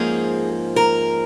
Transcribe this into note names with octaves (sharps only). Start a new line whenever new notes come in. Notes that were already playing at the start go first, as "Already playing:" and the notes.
Already playing: G#2 F3 A#3 C#4 G#4
A#4